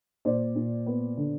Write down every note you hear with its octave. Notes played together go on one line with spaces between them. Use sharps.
A#2 C5 D5
A#2
B3
D3